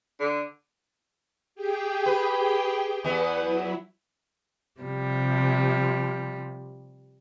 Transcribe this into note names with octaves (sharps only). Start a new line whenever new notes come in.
D3
G4 G#4 G5
B4
E2 E3 B3 B4 F#5
F#3 E4
C3 F3 G3